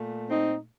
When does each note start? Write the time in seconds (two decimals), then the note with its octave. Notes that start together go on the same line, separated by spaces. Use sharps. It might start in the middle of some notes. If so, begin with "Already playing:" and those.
Already playing: A#2 A3
0.30 C4 D#4